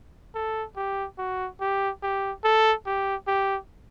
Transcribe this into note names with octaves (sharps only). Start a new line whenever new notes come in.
A4
G4
F#4
G4
G4
A4
G4
G4